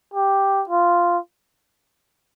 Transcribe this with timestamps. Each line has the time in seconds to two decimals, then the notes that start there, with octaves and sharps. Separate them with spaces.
0.14 G4
0.69 F4